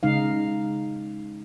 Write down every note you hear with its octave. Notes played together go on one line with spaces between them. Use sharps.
C#3 G#3 D#4 F5